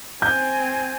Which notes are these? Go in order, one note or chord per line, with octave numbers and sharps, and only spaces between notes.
C4 G#5 G6